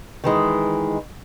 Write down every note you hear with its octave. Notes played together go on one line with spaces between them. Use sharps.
D#3 E3 G#3